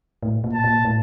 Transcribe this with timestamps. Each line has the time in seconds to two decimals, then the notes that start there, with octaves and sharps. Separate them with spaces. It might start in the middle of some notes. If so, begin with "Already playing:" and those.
0.23 A2
0.44 A#2
0.53 A5
0.64 A#2
0.85 A2